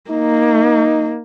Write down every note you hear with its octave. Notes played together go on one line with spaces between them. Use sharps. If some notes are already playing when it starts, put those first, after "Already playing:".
A#3 D#4